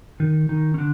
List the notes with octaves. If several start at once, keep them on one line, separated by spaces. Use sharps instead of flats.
D#3 D#4
D#3 D#4
C#4
D3 D4